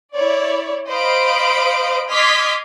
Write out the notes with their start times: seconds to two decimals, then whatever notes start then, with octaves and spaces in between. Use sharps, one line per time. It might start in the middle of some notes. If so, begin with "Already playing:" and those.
0.14 E4 C#5 D5
0.90 C5 D#5 F5 B5 D7
2.10 D#5 C6 D6 F6 G#6 B6